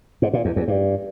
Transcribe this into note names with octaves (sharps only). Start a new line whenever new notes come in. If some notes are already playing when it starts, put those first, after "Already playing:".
G#2
A#2
E2
E2
G2